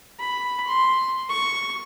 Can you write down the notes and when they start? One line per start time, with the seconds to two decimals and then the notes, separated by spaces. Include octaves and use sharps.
0.19 B5
0.68 C6
1.29 C#6